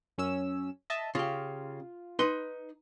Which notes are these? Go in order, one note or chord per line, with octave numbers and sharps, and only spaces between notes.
F#2 C#4 E6
D#5 E5 A5
C#3 F4 G4
D#4 B4 C6